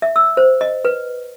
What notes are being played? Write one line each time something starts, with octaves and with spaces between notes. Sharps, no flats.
E5
E6
C5
D#5
B4